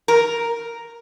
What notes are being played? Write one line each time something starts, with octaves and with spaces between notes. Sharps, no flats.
A#4